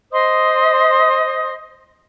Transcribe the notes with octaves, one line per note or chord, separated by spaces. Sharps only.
C5 D#5 C6 D#6